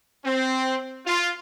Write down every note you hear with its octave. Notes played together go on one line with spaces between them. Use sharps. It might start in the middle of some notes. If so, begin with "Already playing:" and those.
C4
F4